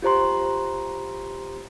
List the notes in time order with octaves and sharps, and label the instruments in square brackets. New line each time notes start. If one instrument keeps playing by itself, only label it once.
[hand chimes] F4 G4 C5 A#5 C6